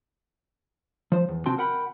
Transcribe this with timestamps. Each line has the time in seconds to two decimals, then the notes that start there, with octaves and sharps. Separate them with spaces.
1.12 F3 C5
1.29 E2
1.46 C3 C4 F#4 G5 A5 C6
1.58 A#4 F#5 G5 B5